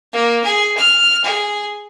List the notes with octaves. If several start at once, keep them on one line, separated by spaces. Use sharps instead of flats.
A#3
G#4
F6
G#4